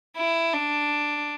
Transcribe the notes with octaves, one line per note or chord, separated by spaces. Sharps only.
E4
D4